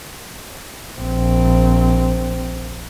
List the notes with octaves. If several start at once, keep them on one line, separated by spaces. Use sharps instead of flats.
A#1 C4